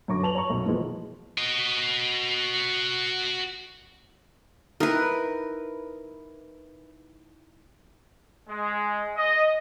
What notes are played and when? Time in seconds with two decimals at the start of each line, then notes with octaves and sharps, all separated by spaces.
0.08 F#2 D3 C#5 C#6 D6 A#6
0.23 B4 A5 F7 F#7
0.35 C#5 A#5 C#6
0.50 B1 F#2
0.66 B2 E3 F3 G#3 A#3 B3
1.38 F#4 D#5
4.80 D#4 E4 A#4 B4
8.49 G#3
9.17 D#5